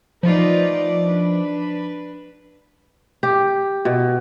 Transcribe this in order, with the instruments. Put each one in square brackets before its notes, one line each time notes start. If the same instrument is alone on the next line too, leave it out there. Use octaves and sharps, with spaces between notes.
[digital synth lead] F3 [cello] A3 D5 [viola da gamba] D#4 F4 B4
[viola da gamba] D4 B4
[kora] G4
B2